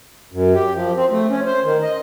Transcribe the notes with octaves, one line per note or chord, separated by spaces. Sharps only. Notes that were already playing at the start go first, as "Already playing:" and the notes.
F#2
G4
F3
C4
A3
C#4
C5
D#3
D#5